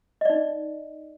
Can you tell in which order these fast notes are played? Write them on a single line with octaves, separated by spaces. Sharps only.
D#5 D5 D#4